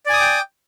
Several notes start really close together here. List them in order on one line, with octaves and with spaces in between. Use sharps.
D5 G#5 D#6 D6 G5